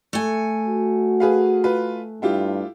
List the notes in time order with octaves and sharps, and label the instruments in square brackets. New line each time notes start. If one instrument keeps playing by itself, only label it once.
[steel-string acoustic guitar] A3 G#5
[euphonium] F#4
[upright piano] G#4 B4 F5
F4 B4
[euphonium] G2 [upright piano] E4 F4 G4